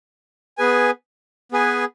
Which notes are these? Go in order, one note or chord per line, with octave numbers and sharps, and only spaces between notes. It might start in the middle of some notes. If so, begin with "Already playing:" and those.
B3 G#4 B4 G#5
B3 G#4 B4 G#5